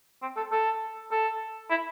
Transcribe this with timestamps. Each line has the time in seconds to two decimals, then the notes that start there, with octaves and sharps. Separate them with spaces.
0.22 C4
0.37 A4
0.52 A4
1.11 A4
1.70 E4